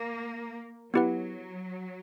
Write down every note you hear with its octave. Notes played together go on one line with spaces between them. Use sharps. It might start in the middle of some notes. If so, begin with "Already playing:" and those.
Already playing: A#3
F#3 B3 E4 G4 B4 F#5